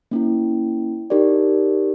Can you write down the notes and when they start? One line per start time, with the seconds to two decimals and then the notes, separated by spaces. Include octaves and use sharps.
0.11 A#3 C#4 E4
1.10 D#4 G4 A#4 D5